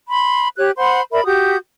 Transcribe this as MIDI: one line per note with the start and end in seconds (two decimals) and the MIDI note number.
0.08 0.48 83
0.08 0.48 84
0.57 0.70 67
0.57 0.70 73
0.57 0.70 90
0.77 1.01 72
0.77 1.01 78
0.77 1.01 83
0.77 1.01 84
1.12 1.23 70
1.12 1.23 74
1.12 1.23 76
1.12 1.23 83
1.25 1.56 66
1.25 1.56 67
1.25 1.56 87
1.25 1.56 91